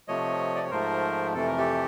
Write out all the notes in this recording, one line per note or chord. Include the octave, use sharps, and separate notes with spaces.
C3 F3 A3 C#5 D#5
D5
C#5
G#2 F3 A3 A#4 C5
F2 C3 E3 A3 A4
A#4
G4 A4